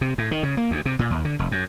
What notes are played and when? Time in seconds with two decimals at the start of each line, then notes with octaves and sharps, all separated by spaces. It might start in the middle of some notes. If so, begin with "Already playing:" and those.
0.01 C3
0.18 A2
0.31 D#3
0.43 C#3
0.57 A#3
0.71 D2
0.86 C3
0.99 A#2
1.11 D#2
1.25 D3
1.39 F1
1.52 F#2